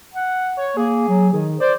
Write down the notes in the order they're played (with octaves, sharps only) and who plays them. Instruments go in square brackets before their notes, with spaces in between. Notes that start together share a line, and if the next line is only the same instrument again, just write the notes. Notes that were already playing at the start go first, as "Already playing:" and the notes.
[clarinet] F#5
[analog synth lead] C#5
[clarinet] A#3 [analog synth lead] G#4
[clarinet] F#3
[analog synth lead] D#3 [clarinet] G#4
[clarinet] C5 [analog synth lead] D5